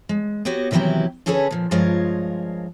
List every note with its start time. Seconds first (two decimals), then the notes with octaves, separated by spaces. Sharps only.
0.09 G#3
0.45 B3 F#4 G4 C#5 D#5
0.71 C3 D#3 E3 F#3 E4 G4
1.26 D3 C#4 G#4 A4 B4 C#5
1.51 A#2 F3
1.71 G2 F3 G#3 F4 A#4 C#5